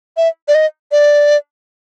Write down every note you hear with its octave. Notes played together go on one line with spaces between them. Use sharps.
E5
D5
D#5
D5